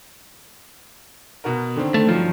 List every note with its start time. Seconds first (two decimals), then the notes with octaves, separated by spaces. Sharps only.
1.44 B2 F#4 A#4
1.76 D3 D#3 C4
1.94 A3
2.08 G2 D#3 F3 F#3